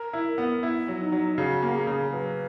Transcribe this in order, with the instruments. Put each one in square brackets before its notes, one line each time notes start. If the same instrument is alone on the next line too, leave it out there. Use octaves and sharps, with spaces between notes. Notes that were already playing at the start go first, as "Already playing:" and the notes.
Already playing: [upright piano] A#4
E4
[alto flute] A#4
[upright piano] B3
E4
F#3
[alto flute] D#4
[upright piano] F#3
[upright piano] C#3 [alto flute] F#4
[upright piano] A#3
[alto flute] G#4
[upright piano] C#3
[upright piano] F#3 [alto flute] B4